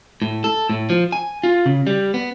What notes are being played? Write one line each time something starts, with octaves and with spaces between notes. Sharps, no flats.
A2
A4
A2
F3
G#5
F4
C#3
G3
B3